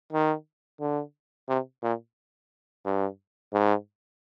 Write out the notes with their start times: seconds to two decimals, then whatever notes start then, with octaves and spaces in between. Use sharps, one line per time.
0.13 D#3
0.81 D3
1.49 C3
1.83 A#2
2.86 G2
3.53 G#2